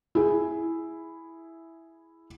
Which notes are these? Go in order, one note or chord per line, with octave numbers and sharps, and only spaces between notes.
E4 G#4